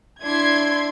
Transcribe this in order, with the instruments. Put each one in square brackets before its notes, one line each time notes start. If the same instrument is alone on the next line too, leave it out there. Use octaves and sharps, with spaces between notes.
[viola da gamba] D4 E4 [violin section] C6 G#6